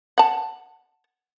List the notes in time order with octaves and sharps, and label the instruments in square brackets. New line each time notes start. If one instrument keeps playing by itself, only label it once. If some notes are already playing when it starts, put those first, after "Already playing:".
[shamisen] F#5 A5